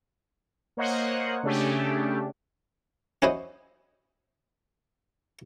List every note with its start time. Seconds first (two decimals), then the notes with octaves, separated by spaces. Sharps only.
0.77 A#3 C5 C#5 D#5 F#5
1.43 C#3 A3 C#4 D4 G4
3.22 C#4 E4 F#4 C5 D#5